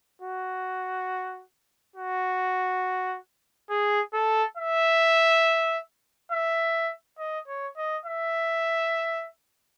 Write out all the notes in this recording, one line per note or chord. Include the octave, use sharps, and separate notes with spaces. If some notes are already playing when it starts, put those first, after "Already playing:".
F#4
F#4
G#4
A4
E5
E5
D#5
C#5
D#5
E5